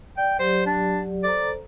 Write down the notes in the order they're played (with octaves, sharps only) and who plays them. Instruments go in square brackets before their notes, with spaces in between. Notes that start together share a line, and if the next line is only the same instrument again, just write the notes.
[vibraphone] D5 [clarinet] G5
[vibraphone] F#3 G4 D5 [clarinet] C5
[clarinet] D4
[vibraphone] A4 C5 A#5 [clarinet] D5